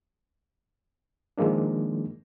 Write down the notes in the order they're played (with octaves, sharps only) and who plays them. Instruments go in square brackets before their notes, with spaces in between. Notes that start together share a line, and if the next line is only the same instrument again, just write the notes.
[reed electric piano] D#3 F3 G#3 A#3 D4